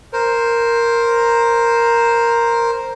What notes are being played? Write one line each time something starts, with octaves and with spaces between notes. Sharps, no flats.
A#4 C5